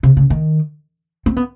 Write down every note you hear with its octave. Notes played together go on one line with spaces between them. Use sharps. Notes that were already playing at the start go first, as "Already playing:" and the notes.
C3
C#3
D#3
C4
B3